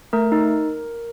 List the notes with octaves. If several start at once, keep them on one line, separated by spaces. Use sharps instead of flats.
A3 A#4
D#4